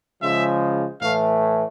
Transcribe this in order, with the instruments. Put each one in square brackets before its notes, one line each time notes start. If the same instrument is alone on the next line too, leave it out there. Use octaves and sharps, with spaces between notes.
[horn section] C#3 F3 G#3 E5
A2 E3 A3 F5